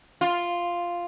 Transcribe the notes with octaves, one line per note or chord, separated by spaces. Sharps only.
F4